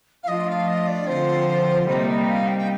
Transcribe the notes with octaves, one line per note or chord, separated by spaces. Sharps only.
F5
F3 A3 D4 F4 D#5
F5
D#5
D5
D3 F3 C4 F4 C5
C3 G3 A#3 D#4 C5
D#5
F5
G5
G5